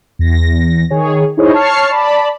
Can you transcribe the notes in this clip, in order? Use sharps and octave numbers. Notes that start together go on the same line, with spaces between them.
E2 A#6
D#3 G#4 C#5
D#4 E4 G#4 C5 C#5 D#5
C#5 A5 C#6 F6 C7 C#7
D5 A5 B5